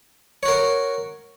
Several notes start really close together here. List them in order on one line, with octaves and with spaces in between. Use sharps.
C#5 F#4 A#4